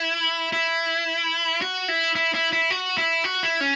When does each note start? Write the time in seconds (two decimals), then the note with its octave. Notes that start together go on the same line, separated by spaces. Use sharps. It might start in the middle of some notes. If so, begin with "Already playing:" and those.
Already playing: E4
0.53 E4
1.62 F#4
1.88 E4
2.16 E4
2.35 E4
2.53 E4
2.70 F#4
2.98 E4
3.24 F#4
3.43 E4
3.61 C#4